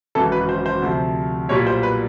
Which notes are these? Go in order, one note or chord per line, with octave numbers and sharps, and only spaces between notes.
G#1 F#2 C#3 E3 A4
B4
C5
C5
D2 C3 F3
B1 A#2 G3 C#5
C5
B4